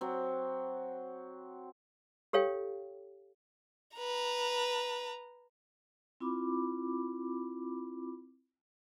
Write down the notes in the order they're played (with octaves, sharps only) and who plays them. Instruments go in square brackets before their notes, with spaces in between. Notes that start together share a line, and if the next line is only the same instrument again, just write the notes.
[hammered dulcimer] F#3 C4
[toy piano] G4 A4 C#5 F5 G5
[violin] B4 A#5
[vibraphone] C4 E4 F4 B5 D6